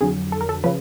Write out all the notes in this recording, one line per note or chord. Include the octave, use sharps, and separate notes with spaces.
F2 D3 F#3 G#4
A4
A#4
A4
C#3 F3 B4